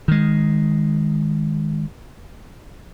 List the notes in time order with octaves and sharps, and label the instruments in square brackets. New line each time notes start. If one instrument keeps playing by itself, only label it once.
[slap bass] D#3 G#3